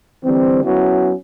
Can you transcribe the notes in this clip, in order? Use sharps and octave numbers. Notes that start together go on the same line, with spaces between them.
D3 E3 G3 C4
F#3 B3 C#4 E4 F#4